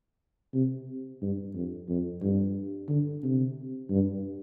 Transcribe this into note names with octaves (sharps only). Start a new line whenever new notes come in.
C3
G2
F2
F2
G2
D3
C3
G2